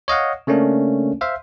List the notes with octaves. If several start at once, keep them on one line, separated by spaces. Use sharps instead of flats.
C#5 D#5 F5 F#5
C#3 A3 A#3 C#4 D4
C5 E5 F5